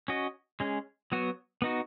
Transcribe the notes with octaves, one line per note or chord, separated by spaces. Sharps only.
C#4 F#4 D#5
G#3 C#4 G#4
F#3 B3 F#4
B3 D#4 F#4